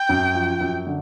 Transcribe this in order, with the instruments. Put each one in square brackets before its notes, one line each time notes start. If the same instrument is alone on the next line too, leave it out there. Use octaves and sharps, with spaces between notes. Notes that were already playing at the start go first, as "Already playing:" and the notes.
Already playing: [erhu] G5
[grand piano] F#2
F3
F#2
D3